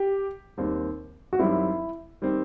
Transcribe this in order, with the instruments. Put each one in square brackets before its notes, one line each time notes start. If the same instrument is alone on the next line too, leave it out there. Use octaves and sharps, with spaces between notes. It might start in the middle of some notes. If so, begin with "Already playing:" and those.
Already playing: [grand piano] G4
[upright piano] D#2 D#3 G3 C4
[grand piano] F#4
[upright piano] F#2 D#3 G3 C4 [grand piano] E4
[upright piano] D#3 G3 C4